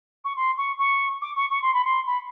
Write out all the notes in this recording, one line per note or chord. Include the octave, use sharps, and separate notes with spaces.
C#6
C6
C#6
C#6
D6
C#6
C#6
C6
B5
C6
B5